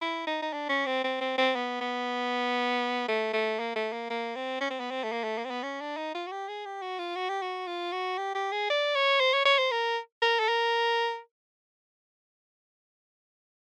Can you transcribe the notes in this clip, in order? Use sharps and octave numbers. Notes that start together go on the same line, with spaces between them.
E4
D#4
D#4
D4
C#4
C4
C4
C4
C4
B3
B3
A3
A3
A#3
A3
A#3
A#3
C4
C#4
C4
B3
C4
A3
A#3
A3
A#3
C4
B3
C#4
D4
D#4
F4
F#4
G4
G#4
G4
F#4
F4
F#4
G4
F#4
F4
F#4
G4
G4
G#4
D5
C#5
C5
C#5
C#5
C5
A#4
A#4
A4
A#4